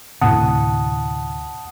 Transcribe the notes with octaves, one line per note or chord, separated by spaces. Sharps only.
D2 A2 C3 F#5 A5 D#6